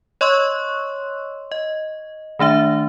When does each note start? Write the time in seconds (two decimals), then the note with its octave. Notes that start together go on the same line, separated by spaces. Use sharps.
0.21 C#5 D#5 C6 C#6 E6 F#6
1.52 D#5
2.39 D#3 A3 D4 E5